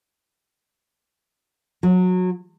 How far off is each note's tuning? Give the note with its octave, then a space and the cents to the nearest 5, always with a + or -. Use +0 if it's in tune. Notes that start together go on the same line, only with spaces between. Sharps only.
F#3 -20